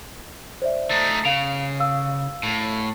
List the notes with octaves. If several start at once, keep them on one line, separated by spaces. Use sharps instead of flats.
C5 D5 E5
A3 D#4
C#3 F5 D7 F7
F5 E6
A2